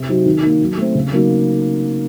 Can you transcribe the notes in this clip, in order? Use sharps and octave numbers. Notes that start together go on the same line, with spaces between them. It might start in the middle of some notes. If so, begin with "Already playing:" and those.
Already playing: C3
F#3 C4 D#4 F#4
D#3
A#3 D#4
F#3
A3 C4
C#3
F#3 A#3 D#4